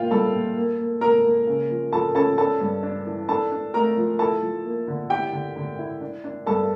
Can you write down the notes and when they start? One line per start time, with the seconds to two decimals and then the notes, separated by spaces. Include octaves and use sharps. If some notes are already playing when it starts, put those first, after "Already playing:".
Already playing: A#2 E4 F4 F5 G5
0.11 G3 A4 A5
0.33 A#2
0.56 A#3
0.79 A#3
1.01 A#3 A#4 A#5
1.24 A#3
1.47 C#3
1.70 F3
1.92 F3 A4 A5
2.15 C#4 A4 A5
2.38 D4 A4 A5
2.60 G2
2.83 D4
3.06 E3
3.28 D4 A4 A5
3.51 D4
3.74 A3 A#4 A#5
3.97 F3
4.19 E4 A4 A5
4.42 F3
4.65 A#3
4.87 D3
5.10 E4 G4 G5
5.32 D3
5.56 D3
5.79 E4
6.01 D4
6.24 D4
6.46 G2 A4 A5